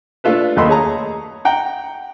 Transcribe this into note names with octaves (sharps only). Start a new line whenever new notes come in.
A3 D4 F4 A4 B4
D#2 A3 A#3 D#5 B5 C6
G#4 C#5 A5 A#5
F#5 G5 A#5